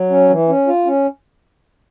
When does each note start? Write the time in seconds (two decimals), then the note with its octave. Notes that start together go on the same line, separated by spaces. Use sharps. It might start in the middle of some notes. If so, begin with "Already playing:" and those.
Already playing: F#3
0.10 C#4
0.30 E3
0.49 C#4
0.67 F4
0.85 C#4